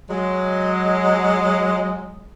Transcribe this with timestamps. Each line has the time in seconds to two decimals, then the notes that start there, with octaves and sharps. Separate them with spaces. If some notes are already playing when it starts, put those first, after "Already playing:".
0.10 F#3 G#3